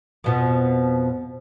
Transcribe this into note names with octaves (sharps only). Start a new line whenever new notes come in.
F2 B2 F3